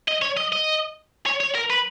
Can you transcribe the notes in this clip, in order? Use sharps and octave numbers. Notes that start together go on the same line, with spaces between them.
D#5
C#5
D#5
D#5
C#5
C#5
A#4
B4